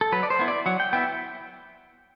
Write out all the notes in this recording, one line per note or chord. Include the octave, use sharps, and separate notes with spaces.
A4
F#3 B4
D5
C5
B3 E4
D5
F#3 F#5
G5
B3 E4 G5